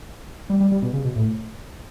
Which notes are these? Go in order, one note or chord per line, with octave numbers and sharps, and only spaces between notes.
G3
G3
G3
B2
C#3
B2
A2